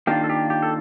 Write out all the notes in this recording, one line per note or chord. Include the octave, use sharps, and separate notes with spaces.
D#3 A#3 D4 F4 G4
A4
G4
G4
A4